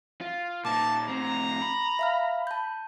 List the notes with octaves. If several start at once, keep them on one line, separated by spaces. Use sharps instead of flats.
F4
A#2 D#4 A5 D6
A2 C4 A#5
B5
E5 F5 F6
A5 G6